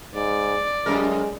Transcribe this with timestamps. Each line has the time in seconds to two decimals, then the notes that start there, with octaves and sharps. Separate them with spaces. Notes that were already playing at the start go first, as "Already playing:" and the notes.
0.15 G#2 D5
0.86 F#2 A2 G#3 A#4